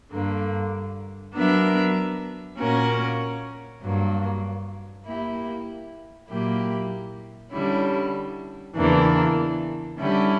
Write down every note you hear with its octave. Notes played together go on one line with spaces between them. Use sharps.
G2 D3 A#3
F#3 B3 D4 A#4 E5
A#2 A#3 C#4 F#4 A#4
G2 F#3 A#3
A#3 E4 G4
A#2 F#3 A#3 E4 G4
D3 G3 C#4 E4
E2 C#3 E3 A#3 D4
D3 G3 C#4 E4 G4